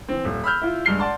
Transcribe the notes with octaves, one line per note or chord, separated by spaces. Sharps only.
E3 C4
D#1
B5 E6 F6 G6
E4 F4
G2 G#3 F6 C7 G7
D5 F#5 A5 C6